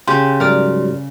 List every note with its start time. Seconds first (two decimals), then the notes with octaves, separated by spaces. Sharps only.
0.07 C#3 G4 C6
0.40 G#2 F#3 G3 A#4 D5